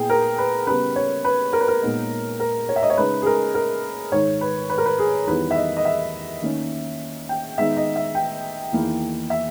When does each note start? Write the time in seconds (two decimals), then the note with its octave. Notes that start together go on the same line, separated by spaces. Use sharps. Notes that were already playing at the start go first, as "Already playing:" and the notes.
Already playing: A#2 B3 E4 G#4 G5
0.10 A#4
0.38 B4
0.67 C#3 G3 B3 B4
0.96 C#5
1.25 B4
1.53 A#4
1.61 B4
1.68 A#4
1.82 A#2 G#3 B3 D#4
2.40 A#4
2.69 C#5
2.76 E5
2.83 D#5
2.90 C#5
2.97 C#3 G#3 D#4 B4
3.22 G#4
3.26 A#4
3.54 A#4
4.12 G#2 D#3 G#3 C#5
4.41 B4
4.70 B4
4.78 A#4
4.86 B4
4.99 G#4
5.27 E2 D#3 G3 B3 E4 B4
5.51 E5
5.56 D#5
5.77 D#5
5.85 E5
6.42 D#3 A#3 C#4
7.29 G5
7.58 D#3 G#3 B3 D#4 E5
7.77 D#5
7.96 E5
8.15 G5
8.72 E2 D#3 A#3 E4
9.30 E5